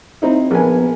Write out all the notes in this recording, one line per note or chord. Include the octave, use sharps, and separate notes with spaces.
C4 D#4 E4
A#1 B3 A#4 G#5